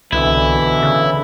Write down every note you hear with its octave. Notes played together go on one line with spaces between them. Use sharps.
C2 B2 D3 E3 E4
C#3